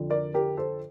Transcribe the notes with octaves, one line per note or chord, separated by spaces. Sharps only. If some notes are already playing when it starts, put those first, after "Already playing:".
Already playing: F2 D3 F3
A#4 D5
G4 A#4
A4 C5